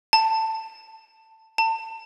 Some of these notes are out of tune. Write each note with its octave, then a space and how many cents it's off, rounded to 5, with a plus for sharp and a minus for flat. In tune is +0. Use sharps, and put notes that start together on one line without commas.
A5 +15
A5 +30